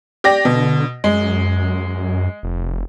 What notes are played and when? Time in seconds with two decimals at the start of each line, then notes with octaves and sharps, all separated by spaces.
0.24 G4 D5 A#6
0.45 B2 D3
1.04 F#2 G#3
2.43 F1